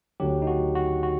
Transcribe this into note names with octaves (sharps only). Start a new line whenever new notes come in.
D2 D3 F#3 G4
D#4
F#4
F#4
F#4